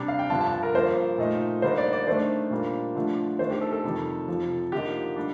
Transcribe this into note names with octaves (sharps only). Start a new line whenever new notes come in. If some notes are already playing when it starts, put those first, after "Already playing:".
Already playing: C3 G3 D4
F5
G5
G2 D3 F3 A5
A5
A5
A#4
G2 F3 A#3 C5
A#2 A3 D#4
D3 G3 A#3 D#4 C5
D5
D5
D#3 A3 D4 C5
A#2 G3 A#3 D4
D3 F3 A3 D4
D#3 A3 D4 C5
G4
A4
A4
F2 C3 D#3 G3
F2 C3 F3
D3 F3 A#3 D#4 G4
G3 D4